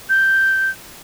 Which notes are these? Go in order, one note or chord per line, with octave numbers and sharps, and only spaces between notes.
G6